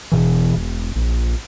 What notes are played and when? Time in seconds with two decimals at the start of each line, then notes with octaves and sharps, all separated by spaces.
0.12 E1 B2 E3
0.56 E1
0.96 A#1